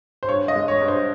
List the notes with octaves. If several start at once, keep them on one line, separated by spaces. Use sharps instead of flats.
C5
G2 C#5
D#5
G#3
C#5
G2
C5